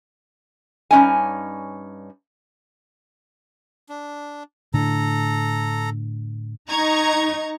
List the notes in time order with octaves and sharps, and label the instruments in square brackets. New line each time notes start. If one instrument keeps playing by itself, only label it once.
[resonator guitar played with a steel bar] G2 F3 C#4 D#4 G#5
[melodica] D4
[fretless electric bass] A2 D3 [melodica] A4 A#5
[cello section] D#4 [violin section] A#5 C#6 G#6